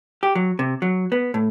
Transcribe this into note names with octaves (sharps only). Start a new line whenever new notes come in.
G4
F#3
C3
F#3
B3
A2